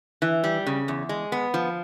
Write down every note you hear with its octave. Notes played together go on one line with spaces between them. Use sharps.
E3
G3
C#3
E2
G#3
B3
F3